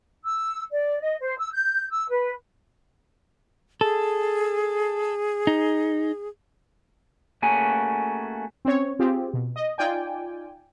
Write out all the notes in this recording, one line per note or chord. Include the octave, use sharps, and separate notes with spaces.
E6
D5
D#5
C5
E6
G6
E6
B4
G#4 A4
D#4
A3 A#3 C#4 F#4 G#4 G#5
C4 C#4 C#5
C4 F4 G4 G#4
B2
D#5
D#4 F4 D5 G5 G#5